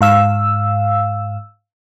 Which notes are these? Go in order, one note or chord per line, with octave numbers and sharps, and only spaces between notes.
G#2 F5 E6